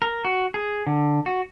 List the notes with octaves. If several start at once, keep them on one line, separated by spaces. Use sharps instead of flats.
A#4
F#4
G#4
D3
F#4